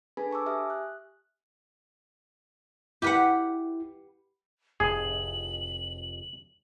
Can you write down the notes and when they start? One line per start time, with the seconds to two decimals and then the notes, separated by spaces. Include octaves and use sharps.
0.17 D4 G#4 A4 B4 G#5 B5
0.31 A5 C#6 D6 E6
0.46 G4 E5 G#5 D#6 F6
0.70 F#6
3.02 E4 G4 B4 F#5
4.80 F1 F2 A2 G#4 F#7